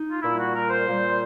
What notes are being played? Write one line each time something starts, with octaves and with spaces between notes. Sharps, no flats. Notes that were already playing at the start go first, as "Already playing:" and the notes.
Already playing: D#4
F4
A#2 G3 E4
F#4
A#4
C5
A#2 G3